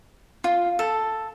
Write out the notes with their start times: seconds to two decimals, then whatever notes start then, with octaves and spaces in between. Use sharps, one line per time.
0.44 F4
0.79 A4